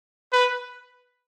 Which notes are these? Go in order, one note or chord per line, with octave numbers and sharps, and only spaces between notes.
B4